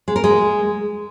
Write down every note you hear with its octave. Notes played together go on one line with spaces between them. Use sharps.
G#3
A#4
G#3